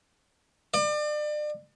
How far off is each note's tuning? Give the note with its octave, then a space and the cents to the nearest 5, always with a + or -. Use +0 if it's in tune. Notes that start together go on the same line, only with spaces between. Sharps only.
D5 +35